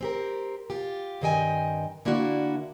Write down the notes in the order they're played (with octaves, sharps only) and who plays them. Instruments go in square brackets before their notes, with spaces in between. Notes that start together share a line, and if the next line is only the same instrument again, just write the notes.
[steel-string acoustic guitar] C4 G4 A#4
F4 G4
G2 D#3 C4 D#5 G5 G#5
D3 A#3 D4 E4 F#4